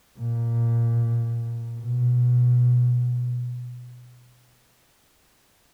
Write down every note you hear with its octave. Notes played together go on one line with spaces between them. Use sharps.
A#2
B2